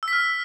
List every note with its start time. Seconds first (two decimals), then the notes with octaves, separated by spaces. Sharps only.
0.03 E6
0.08 B6
0.13 F6